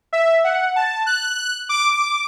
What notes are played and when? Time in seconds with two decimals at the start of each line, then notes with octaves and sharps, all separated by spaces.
0.13 E5
0.44 F#5
0.76 A5
1.06 F#6
1.69 D6